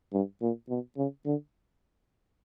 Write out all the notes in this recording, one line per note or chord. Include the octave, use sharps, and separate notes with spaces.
G2
A#2
B2
C#3
D3